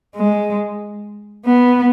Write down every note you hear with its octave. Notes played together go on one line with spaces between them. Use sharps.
G#3
B3